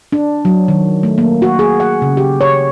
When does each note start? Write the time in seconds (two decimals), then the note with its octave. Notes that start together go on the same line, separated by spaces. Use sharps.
0.12 D4
0.45 F#3
0.68 D#3
1.03 A3
1.18 A#3
1.42 F#4
1.59 G#4
1.80 F#5
2.02 C#3
2.17 G4
2.41 C#5